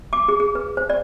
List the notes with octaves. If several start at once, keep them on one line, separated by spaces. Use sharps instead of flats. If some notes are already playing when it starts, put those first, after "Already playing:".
D6
G#4
G#4
B4
C5
D5